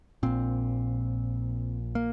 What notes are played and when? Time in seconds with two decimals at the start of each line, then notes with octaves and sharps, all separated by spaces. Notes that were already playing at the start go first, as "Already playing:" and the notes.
0.23 A#1 A#2 C4
1.95 A#3